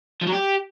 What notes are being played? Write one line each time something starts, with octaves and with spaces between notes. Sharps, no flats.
F3
F#3
G4